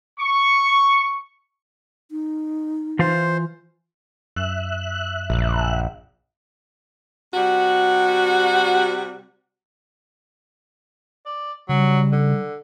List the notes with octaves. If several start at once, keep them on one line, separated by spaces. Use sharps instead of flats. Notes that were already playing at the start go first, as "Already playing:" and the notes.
C#6
D#4
E3 F4 C5 F5
F#2 E5 F#6
A#1
C3 G3 F#4
D5
C#3 F#3 G3
D3